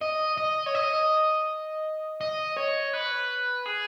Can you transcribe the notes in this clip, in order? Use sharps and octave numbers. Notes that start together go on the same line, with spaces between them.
D#5
D#5
C#5
D#5
D#5
C#5
B4
G#4